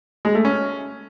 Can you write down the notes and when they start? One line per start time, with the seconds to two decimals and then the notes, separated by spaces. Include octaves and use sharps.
0.25 G#3
0.35 A3
0.45 C#4